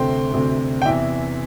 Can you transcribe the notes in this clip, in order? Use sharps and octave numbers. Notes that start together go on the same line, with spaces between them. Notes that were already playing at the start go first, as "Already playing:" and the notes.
Already playing: D2 C3 A3 C4 G5 C6
D2 C3 A3 C4
G5
E2 C3 E3 E5